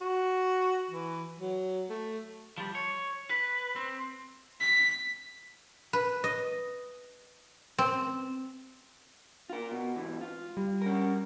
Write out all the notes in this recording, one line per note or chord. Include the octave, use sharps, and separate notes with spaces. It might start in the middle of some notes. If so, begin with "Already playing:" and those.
F#4
E3
F#3
A3
F3 G3
C#5
B4
C4
B6
B4
D#5
C4
F4 A#4
B2
G#2 E3
F4
G3
C#4 A#4